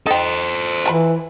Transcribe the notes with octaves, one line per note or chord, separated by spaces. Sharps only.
D#4 A4 C5 G5
E3 F4 A5 B5